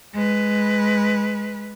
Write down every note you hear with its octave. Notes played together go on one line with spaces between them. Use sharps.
G#3 B4